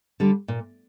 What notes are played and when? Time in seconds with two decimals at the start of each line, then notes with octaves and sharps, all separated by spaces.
0.20 D3 G3
0.48 A#2